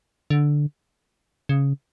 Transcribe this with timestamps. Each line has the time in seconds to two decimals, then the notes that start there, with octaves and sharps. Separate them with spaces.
0.30 D3
1.49 C#3